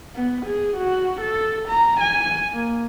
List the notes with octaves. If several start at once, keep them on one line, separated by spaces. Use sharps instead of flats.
B3
G#4
F#4
A4
A#5
G#5
A#3